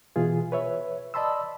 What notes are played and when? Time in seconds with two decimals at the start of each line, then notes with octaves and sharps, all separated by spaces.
0.16 B2 E3 F4 G#4
0.52 B4 C#5 E5
1.14 D5 D#5 A5 B5 C6 E6